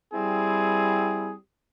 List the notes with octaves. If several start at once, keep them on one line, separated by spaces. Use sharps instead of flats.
G3 C4 E4 G#4